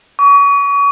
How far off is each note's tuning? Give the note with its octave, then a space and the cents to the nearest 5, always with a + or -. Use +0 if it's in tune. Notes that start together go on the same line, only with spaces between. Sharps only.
C#6 +35